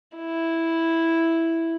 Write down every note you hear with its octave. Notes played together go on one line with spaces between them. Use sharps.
E4